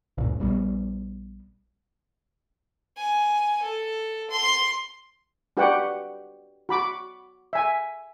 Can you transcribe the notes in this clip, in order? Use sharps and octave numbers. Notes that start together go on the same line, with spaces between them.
D2 G2 A#2 C#3
A#1 G3 B3
G#5
A4
C6
D4 F#4 G4 B4 F#5 G5
F#4 B5 D6
E5 G#5